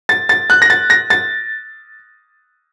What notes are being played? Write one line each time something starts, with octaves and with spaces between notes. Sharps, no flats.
A6
A6
F#6
A#6
A6
A#6
A6